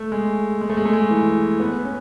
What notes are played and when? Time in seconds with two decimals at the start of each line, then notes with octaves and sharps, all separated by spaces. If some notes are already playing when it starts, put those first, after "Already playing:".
Already playing: A3
0.12 G#3
0.61 G#3
0.70 A3
0.77 G#3
0.85 A3
0.93 G#3
1.11 E3
1.60 B3
1.85 C#4